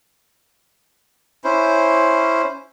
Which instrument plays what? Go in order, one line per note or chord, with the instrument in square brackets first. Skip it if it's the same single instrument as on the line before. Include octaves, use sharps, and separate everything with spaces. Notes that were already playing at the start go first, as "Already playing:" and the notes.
[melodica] C#4 E4 C5